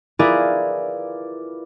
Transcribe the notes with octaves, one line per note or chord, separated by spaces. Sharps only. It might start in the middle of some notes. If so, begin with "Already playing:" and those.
E4 F4 G#4 A#4 B4 D5